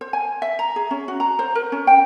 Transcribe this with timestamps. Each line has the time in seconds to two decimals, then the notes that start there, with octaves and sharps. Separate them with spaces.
0.01 C5
0.13 G#5
0.42 E5
0.59 A#5
0.76 G#4
0.91 C#4
1.08 F#4
1.20 A#5
1.39 C5
1.55 A#4
1.72 C#4
1.87 G5